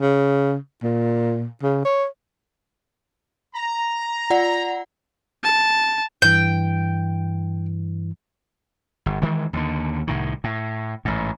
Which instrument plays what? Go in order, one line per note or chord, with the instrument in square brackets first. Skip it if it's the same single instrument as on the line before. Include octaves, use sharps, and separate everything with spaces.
[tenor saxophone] C#3
A#2
C#3
C#5
[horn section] A#5
[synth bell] F4 D5 F#5
[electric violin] A5
[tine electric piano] G2 E3 [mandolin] G5
[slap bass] G1
D#3 E3 G#3
D#2 D3
C2 A2 D#3
A2
A1 G#2